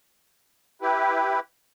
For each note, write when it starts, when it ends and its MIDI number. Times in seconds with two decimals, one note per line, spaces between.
0.82 1.40 64
0.82 1.40 67
0.82 1.40 71